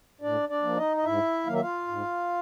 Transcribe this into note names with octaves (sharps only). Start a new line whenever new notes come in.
A2 D4 D5
D4 D5
F3 A#3
D#4 D#5
D#5
G#2 E4 E5
D#3 F#3 A#3 F5
E5
F4 F5
G#2